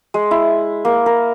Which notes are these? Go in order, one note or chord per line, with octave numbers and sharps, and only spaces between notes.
G#3
E4
A#3
A#4